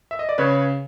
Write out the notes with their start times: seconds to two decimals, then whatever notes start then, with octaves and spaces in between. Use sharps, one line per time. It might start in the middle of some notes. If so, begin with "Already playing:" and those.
0.11 E5
0.19 D#5
0.29 D5
0.38 C#3 B4 C#5